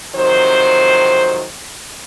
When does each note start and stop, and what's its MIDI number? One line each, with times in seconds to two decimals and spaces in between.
0.15 1.46 41
0.15 1.46 48
0.15 1.46 51
0.15 1.46 54
0.15 1.46 72